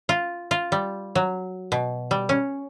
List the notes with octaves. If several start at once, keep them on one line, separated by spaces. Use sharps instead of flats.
F4
F4
G3
F#3
B2
G3
C#4